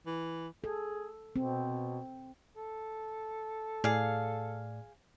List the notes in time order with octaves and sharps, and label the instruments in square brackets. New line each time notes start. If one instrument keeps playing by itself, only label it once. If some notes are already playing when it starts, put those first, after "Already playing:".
[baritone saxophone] E3
[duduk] G#4 [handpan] A4
[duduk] B2 [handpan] C4
[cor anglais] A4
[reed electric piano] A2 D5 F6 [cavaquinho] G#4 F5